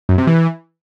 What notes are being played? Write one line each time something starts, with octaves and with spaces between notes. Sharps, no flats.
F#2
C3
E3